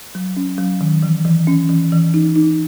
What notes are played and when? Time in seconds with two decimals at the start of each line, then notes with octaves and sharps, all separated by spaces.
0.15 F#3
0.37 C#4
0.58 F#3
0.81 D#3
1.03 E3
1.25 E3
1.47 C#4
1.69 E3
1.92 E3
2.14 D#4
2.36 D#4